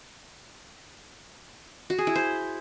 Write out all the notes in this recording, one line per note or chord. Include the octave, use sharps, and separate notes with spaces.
F#4
G#4
E4
C5